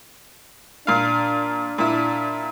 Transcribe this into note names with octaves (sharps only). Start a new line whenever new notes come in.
A#2 D4 F5
A#2 E4